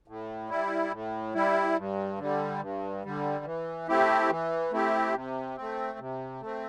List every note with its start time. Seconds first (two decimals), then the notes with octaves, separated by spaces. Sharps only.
0.08 A2
0.50 G3 E4
0.92 A2
1.35 G3 E4
1.77 G2
2.19 D3 G3
2.61 G2
3.03 D3 G3
3.45 E3
3.88 A3 C4 E4 G4
4.29 E3
4.72 A3 C4 E4 G4
5.14 C3
5.57 A3 C4
5.99 C3
6.41 A3 C4